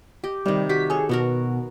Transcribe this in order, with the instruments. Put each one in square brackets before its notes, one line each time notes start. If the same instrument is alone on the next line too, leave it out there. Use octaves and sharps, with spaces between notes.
[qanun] G4 D#5
[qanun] C3 D#3 [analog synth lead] G3
[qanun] G3 F#4 G4 [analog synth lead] B6
[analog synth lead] G#4 [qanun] A4 C#5
[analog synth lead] B2 [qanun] B3 F#4 A#4